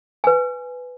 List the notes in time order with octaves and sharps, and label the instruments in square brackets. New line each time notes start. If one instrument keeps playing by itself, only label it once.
[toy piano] B4 G#5